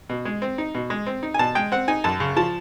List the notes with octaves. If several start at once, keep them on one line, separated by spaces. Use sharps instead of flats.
B2
G#3
C4
D#4
B2
G#3
C4
D#4
G#5
B2 A5
G#3 G5
C4 F#5
D#4 G#5
F#2 A5
C#3
F3 A5